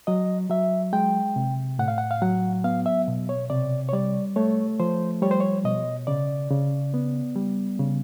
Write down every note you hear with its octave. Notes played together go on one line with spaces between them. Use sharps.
F#3 D#5
F#3 E5
G#3 G5
C3
A2 F#5
F5
F#5
F5
F#3 F#5
B3 F5
E5
B2
C#5
C3 D5
C#5
G3 D5
A3 C#5
F3 C5
G3 C#5
C5
C#5
B2 D#5
C#3 D5
C#3
B3
G3
C#3